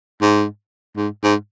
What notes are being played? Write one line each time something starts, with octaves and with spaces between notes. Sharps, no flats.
G#2
G#2
G#2